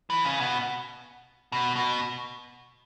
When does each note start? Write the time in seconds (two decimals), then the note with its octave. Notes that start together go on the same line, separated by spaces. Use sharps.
0.10 E3
0.25 C#3
0.40 B2
1.52 B2
1.76 B2